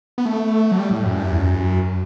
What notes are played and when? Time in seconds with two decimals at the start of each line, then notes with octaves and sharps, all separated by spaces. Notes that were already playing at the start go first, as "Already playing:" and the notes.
0.18 B3
0.26 A3
0.72 F#3
0.78 G3
0.91 A2
1.04 F#2
1.18 G2
1.25 F#2
1.32 E2
1.39 F#2